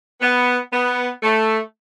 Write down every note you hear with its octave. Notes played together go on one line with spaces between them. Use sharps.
B3
B3
A3